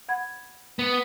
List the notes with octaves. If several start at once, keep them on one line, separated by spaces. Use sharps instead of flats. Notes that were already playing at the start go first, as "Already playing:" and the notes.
F#5 B5 G#6
B3